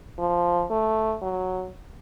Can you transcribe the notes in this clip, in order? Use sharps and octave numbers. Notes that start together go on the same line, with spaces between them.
F3
A3
F#3